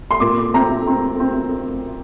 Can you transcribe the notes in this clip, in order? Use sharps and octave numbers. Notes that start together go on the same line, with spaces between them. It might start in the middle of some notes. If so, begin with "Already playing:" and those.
C6
A#2 D6
C4 A#5
C4
C4